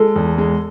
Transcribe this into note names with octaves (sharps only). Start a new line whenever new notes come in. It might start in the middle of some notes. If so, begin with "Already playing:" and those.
Already playing: G#3 A4
E2
G#3